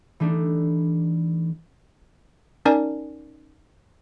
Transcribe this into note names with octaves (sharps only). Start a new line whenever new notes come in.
E3 G3 A3 D4 D#4
C#4 D#4 A#4 D5 G#5 A5